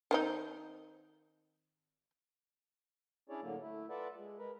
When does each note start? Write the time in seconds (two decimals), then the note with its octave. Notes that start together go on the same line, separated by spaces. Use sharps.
0.11 D#3 C4 D#4
3.29 C#4 D4 E4 G#4 C#5 D5
3.42 A2 D3 F#3 A#3
3.61 A3 E4
3.90 F4 A4 B4 D5 E5 F#5
4.17 G#3
4.39 G#3 A#4 B4